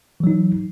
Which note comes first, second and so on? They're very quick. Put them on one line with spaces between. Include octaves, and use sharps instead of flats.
E3 F#3 D#4